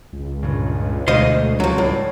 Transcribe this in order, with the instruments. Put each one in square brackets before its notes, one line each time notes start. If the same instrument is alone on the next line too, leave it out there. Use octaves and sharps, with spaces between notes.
[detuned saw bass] C#2
[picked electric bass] G2 A#2 C#3
[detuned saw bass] D2 [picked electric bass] B2 G#3 A3 [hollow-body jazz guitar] C5 D#5 F5
[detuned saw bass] C#2 [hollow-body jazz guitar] F3 F#3
[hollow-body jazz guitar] A2 [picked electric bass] G3